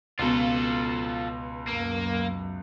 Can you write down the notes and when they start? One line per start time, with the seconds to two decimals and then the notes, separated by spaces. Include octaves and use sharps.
0.19 C#2 B2 F4 A4
1.67 F#2 A#3